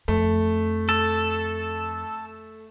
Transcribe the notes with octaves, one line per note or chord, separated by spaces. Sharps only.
F2 A3
A4